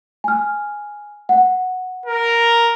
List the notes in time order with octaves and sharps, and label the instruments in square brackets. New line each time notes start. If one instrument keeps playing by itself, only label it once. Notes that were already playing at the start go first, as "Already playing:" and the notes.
[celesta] G#5 F6
F#5
[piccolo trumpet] A#4